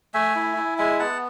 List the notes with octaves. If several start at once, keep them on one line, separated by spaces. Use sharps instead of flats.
A3 E5 G#5
E4
E4
G#3 E5 G#5
B3 F#5 A5